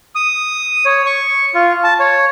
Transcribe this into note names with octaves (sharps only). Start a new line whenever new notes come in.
D#6
C#5
C#6
F4
A5
C#5